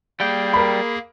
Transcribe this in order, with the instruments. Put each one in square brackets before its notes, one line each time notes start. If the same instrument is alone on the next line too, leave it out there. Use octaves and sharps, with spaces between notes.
[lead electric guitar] G3 G5 [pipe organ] A#3 G#4
[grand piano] A#4 B5